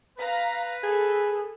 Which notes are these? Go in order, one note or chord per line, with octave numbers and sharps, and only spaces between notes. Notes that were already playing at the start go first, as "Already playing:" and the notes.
B4 F5 A#5
G#4 A4